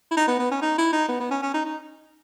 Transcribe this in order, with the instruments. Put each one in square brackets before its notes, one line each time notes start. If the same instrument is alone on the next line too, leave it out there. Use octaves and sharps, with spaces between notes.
[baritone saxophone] E4
D#4
B3
B3
C#4
D#4
E4
D#4
B3
B3
C#4
C#4
D#4
D#4